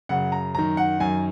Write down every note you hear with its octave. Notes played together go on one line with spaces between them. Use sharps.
F#2 C#3 F#5
A#5
F#2 D#3 A#5
F#5
F#2 D#3 G#5